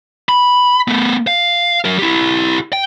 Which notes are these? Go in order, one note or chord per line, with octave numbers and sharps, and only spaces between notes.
B5
A3 B3
F5
F#3 A#4
E4 G4
G5